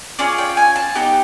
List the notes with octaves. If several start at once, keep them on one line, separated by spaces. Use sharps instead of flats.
C#4 F4 G#4 D5
G5
G#5
A5
B3 D#4 G4